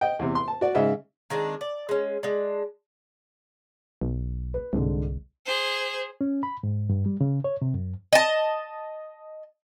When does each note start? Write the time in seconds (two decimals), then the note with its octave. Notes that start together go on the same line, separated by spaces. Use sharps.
0.01 D#5 G5
0.19 E2 C3
0.35 C6
0.48 A5
0.61 F#4 D5
0.75 G#2 C#3 D#5 E5
1.30 D#3 G#3 C4 D4
1.61 D5
1.89 G#3 C#4
2.23 G#3 D4
4.01 B1
4.54 B4
4.73 C2 G#2 D3
5.46 G#4 C5
6.21 C#4
6.43 B5
6.63 G#2
6.89 G2
7.06 G3
7.21 C#3
7.44 C#5
7.62 C3
7.74 F#2
8.13 D#5 A5